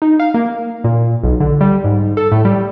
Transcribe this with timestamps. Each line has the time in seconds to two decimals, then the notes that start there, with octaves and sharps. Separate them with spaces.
0.02 D#4
0.20 F5
0.34 A#3
0.84 A#2
1.23 B1
1.40 D3
1.61 G3
1.84 G#2
2.17 A4
2.32 A2
2.45 G3